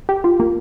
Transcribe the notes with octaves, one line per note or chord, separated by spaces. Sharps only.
G4
F4
A#3